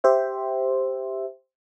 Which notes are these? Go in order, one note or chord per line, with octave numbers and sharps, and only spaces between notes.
G4 C5 E5